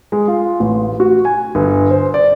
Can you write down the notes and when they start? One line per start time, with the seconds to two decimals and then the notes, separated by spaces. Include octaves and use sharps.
0.12 G#3
0.28 F4
0.60 A1
1.00 F#4
1.25 G#5
1.55 G1
1.91 C5
2.14 D5